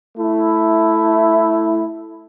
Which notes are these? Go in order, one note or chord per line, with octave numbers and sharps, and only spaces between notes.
A3 E4